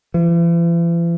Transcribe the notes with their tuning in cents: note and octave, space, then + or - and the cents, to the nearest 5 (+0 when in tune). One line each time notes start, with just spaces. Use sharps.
E3 +45